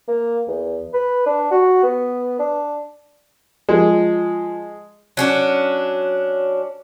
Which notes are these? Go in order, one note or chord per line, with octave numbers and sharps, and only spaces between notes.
A#3
E2
B4
D4
F#4
B3
D4
F3 G#3
F#3 C#4 D4